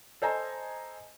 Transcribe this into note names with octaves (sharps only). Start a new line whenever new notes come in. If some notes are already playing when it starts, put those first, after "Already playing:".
A4 C5 D#5 G#5 A#5